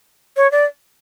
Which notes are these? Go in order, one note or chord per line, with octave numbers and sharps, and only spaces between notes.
C#5
D5